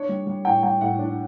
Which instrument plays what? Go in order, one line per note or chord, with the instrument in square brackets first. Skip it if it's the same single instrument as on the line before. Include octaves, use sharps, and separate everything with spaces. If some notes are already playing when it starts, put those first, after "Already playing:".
Already playing: [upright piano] D4 C#5
G3
G3
A2 G5
G3 G5
A2 F#5
D4